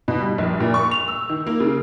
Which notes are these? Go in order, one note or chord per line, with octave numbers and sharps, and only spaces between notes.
B2
G3
A#1
A#2
C#6
F7
E6
D#3
A#3
C#3